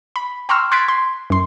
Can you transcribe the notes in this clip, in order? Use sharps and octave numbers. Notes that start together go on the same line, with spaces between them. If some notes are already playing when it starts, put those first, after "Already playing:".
B5
G5 A#5 C6 C#6 E6 F6
C6 F#6 G#6 A6 B6 D7
C6
F#2 C6